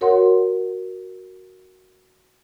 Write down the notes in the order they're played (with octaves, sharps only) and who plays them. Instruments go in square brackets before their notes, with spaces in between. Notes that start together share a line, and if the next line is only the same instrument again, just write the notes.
[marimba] F#4 A#4 C#5 F#5 C6